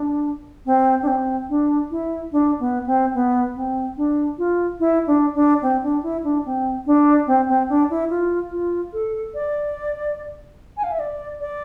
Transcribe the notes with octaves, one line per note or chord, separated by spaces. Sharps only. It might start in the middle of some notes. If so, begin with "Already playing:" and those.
Already playing: D4
C4
D4
C4
D4
E4
D4
B3
C4
B3
C4
D4
F4
E4
D4
D4
C4
D4
E4
D4
C4
D4
C4
C4
D4
E4
F4
F4
A4
D5
G#5
F5
E5
D5
D5